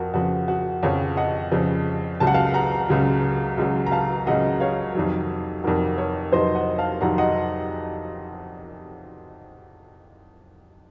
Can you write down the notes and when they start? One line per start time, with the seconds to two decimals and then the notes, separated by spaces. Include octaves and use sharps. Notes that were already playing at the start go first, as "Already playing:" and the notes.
Already playing: F2 F3 F#4 A#4
0.14 F2 C#3 F3 F#4
0.48 F#4
0.83 F2 C#3 F3 C#5 F5
1.17 D#5 F#5
1.52 F2 C#3 F3
2.20 C#2 C#3 F#3 A5
2.27 F#5
2.34 F5 A5
2.54 F#5 A#5
2.89 C#2 C#3 F#3
3.57 C#2 C#3 F#3
3.86 A#5
3.92 F5 A5
4.26 C#2 C#3 F#3 D#5 F#5
4.60 C#5 F5
4.95 F2 C3 D#3 F#3
5.63 F2 C3 D#3 F#3 F#4 A#4
5.98 A#4 C#5
6.32 F2 C3 D#3 F#3 C5 D#5
6.55 D#5 F#5
6.78 F5 A5
7.01 F2 C3 D#3 F#3 F#5 A#5
7.18 D#5 F#5